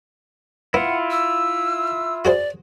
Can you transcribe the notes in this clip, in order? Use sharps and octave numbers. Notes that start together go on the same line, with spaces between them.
B3 E4 F4 F#5
E6
F#4 G#4 C5 D5